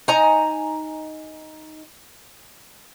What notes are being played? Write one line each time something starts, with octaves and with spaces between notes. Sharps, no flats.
D#4 G#5 A#5